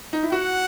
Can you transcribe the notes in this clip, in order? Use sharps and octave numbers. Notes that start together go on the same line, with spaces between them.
D#4
E4
F#4 F#5